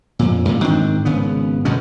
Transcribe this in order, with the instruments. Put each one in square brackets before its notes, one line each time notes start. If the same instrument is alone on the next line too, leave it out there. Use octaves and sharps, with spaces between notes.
[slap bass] F2 A#2
F#2 A#2
G#2 D#3 C4 D4
G#1 C#3 B3
G1 F#2 B2 C#4